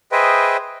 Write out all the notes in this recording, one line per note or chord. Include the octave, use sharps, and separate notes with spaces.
G#4 B4 C5 D#5 E5 G5